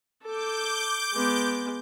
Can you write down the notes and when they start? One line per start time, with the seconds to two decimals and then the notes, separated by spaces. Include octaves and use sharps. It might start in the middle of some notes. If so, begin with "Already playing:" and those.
0.23 A4 D6 G6
1.13 G#3 B3